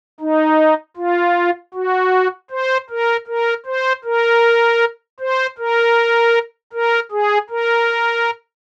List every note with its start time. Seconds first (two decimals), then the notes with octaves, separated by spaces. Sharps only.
0.20 D#4
0.97 F4
1.74 F#4
2.50 C5
2.90 A#4
3.27 A#4
3.66 C5
4.04 A#4
5.20 C5
5.58 A#4
6.73 A#4
7.11 G#4
7.50 A#4